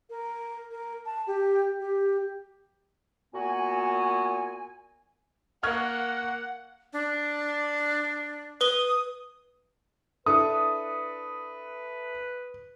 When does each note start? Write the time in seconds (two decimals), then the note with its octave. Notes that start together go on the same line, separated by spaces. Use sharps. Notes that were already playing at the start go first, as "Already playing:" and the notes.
0.10 A#4
0.71 A#4
1.05 A5
1.27 G4
1.79 G4
3.34 A#2 B3 F#4 G#5
5.63 A#3 F#5 C#6 F6 G#6
6.93 D4
8.61 B4 D#6 G7
10.26 D4 E4 A4 B4 D#6